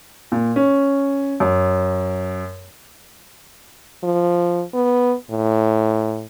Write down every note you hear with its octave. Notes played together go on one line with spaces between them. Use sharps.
A#2
C#4
F#2
F3
B3
A2